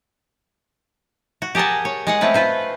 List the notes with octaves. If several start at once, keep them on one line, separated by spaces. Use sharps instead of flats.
F#4
G4 G#4 A#4 F#5 A5
C#5
G#3 G#4 F#5
A3 C4 C#4 B4
F4 B4 C5